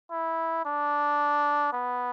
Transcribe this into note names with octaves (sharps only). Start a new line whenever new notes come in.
E4
D4
B3